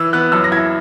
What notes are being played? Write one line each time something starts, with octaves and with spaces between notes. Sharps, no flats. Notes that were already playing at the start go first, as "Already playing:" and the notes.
Already playing: E3 E6
B3 F#6
F#2 E6
A#6
E4 G#6